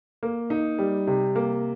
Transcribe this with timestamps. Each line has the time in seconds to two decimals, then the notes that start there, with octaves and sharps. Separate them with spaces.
0.23 A#3
0.50 D#4
0.79 G3
1.07 C3
1.36 A#3